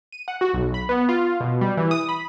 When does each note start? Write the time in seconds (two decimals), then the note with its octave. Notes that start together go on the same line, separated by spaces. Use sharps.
0.12 D#7
0.28 F#5
0.41 F#4
0.53 B1
0.74 B5
0.89 B3
1.09 F4
1.40 B2
1.61 G3
1.77 E3
1.91 D#6
2.09 B5